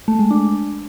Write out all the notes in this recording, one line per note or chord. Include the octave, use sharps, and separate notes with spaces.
A3
G#3
D4